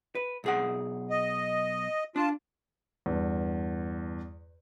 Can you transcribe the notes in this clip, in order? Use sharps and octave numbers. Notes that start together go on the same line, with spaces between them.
B4
B1 G#4 F#5
D#5
D4 F4 A5
E2 G2